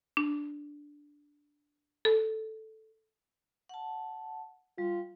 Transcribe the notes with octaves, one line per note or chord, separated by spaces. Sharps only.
D4
A4
F#5 A5
G3 F4